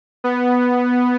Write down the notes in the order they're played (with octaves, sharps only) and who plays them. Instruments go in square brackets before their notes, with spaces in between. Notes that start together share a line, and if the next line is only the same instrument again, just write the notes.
[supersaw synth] B3